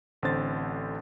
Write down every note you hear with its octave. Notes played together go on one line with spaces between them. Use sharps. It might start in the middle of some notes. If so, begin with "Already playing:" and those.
A1 D3 C4 C5 A6